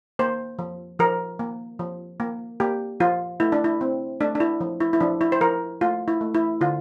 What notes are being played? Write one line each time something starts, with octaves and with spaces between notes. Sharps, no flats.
A#3 C5
F3
F3 A#4
A#3
F3
A#3
A#3 G4
F3 F4
A3 E4
D4
E4
C4
A3 D4
D4
E4
F3
E4
E4
F3 D4
E4
C5
F3 A#4
A3 F4
E4
A3
E4
D3 F4